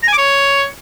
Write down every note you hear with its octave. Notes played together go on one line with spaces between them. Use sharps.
A#5
G#5
D6
C#5